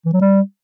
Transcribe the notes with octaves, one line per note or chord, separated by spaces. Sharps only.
E3
F#3
G3